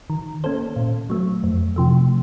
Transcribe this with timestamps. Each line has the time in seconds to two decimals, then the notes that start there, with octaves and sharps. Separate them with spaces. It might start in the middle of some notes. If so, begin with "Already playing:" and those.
0.10 D#3
0.44 A#3 C#4 A4 C5
0.76 A#2
1.10 F#3 A3
1.44 F2
1.76 C3 F3 A3